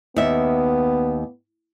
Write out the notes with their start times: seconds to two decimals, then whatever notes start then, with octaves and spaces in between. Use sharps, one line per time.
0.16 D#2 B3 E5